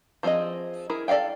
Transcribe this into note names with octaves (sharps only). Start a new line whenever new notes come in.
F3 C4 D4 G#4 D#5
E4 G#4 A#4
A4 D5 E5 F5 G5